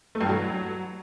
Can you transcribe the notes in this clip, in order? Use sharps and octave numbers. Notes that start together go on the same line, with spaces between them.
A3
G2
F#3